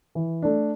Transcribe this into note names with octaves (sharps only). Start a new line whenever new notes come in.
E3
A3 D4